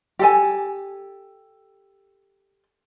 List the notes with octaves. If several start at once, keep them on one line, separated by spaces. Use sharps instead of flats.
G4 A4 G#5